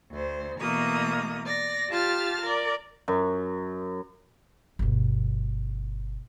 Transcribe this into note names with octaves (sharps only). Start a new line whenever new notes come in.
D2 C5
B2 E3 A3 A#3 A#5 D#6
D5 A#6
F4 G4 A5 F6 A6
A#4 D5
F#2
G1 B2